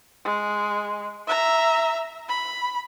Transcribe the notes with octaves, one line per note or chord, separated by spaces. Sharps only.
G#3
E5 A#5
B5